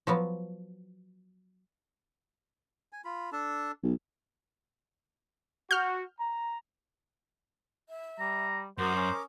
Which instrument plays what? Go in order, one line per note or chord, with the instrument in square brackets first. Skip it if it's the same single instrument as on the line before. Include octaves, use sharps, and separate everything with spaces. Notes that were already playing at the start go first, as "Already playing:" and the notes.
[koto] F3 F#3 B3
[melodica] G#5
F4 B5
D4 A4 A5
[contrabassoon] B1
[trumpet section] F#4 [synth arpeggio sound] F6 G6
[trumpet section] A#5
[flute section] E5
[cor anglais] G3 [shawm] A#5
[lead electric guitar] F#2 [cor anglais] F#4 [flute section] A#4 D6 D#6 [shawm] C5
[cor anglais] C#4